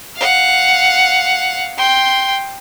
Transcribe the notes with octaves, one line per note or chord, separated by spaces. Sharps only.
F5 F#5
G5 C6